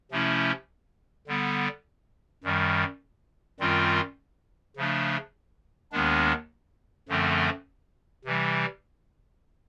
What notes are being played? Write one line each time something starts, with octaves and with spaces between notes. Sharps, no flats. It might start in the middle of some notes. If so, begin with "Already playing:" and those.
C3 F3 A3 C#4 E4
D3 G3 B3
F#2 D#3 G3
F#2 D#3 G3 C4 F4
C#3 F3 A3 D4
D#2 D#3 G#3 B3 D4
F#2 D3 F3 A3 C4
C3 E3 G3